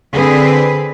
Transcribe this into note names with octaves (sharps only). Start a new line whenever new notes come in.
D3 C4 G#4 B4